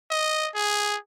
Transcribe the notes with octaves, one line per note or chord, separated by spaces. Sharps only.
D#5
G#4